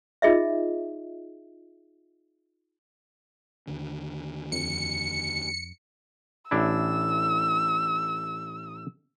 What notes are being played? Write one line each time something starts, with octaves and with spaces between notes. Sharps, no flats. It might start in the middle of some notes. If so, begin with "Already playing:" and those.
D#4 F4 G#4 D#5 E5
D#2 D3
F2 C#7
A1 D4 E4 E6